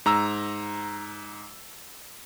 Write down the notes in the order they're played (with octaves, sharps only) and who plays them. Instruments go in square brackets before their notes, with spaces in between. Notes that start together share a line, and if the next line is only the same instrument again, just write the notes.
[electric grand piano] G#2 A#5 E6